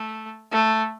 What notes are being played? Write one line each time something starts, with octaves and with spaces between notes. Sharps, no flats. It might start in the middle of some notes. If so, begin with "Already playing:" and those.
Already playing: A3
A3